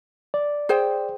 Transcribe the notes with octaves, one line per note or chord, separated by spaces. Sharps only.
D5
G#4 C5 G5